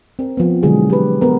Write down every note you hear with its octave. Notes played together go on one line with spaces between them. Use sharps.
C4 A#4
F3 B3
B2 D3 E3 F#3 G#3 G#4
G4 B4
B3 A#4